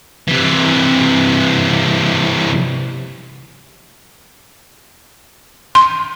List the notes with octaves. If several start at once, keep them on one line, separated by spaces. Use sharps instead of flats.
C3 E3
C6